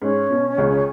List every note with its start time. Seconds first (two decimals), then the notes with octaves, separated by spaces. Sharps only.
0.02 G#2 C#4
0.30 B2
0.58 C#2 C#3